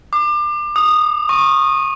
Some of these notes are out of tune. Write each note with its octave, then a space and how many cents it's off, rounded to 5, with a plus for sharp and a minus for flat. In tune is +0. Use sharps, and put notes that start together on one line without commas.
D6 +30
D#6 -15
C#6 -20